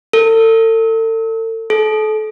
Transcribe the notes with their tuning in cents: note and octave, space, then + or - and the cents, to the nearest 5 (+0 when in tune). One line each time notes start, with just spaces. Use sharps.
A4 +35
A4 -35